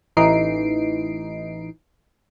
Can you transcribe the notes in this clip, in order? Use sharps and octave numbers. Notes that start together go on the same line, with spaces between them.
A1 E3 D#4 C7 D7